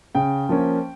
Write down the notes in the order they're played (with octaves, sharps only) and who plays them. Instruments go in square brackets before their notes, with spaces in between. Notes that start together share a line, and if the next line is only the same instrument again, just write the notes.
[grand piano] C#3 G5
F3 A#3 C#4